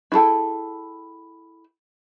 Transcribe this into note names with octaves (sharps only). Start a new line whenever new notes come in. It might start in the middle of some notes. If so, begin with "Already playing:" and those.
E4 F4 G#4 A4 G5